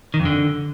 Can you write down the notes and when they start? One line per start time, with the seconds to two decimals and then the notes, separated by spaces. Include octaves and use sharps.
0.14 D#3
0.20 F2
0.25 D3